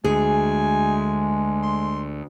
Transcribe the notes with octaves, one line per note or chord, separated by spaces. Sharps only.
D2 G#3 G#4 G#5
C6